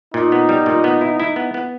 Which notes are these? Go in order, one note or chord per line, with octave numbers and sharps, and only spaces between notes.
A#2 D#4
B3
G3
A#2
B3
E4
E4
B3
B3